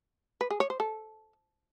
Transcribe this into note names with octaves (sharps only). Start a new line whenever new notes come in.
B4
G#4
C#5
C5
A4